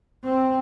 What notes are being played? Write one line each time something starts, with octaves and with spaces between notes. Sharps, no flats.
C4